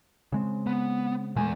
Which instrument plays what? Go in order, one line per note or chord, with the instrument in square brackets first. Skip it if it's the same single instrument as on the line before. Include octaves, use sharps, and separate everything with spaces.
[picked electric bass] C#3 G#3 C4
[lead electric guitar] B3
[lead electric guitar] E2 G#5 [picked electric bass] A#2 G#3 A3